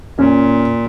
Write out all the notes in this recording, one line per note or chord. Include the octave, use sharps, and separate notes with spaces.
A#2 C#4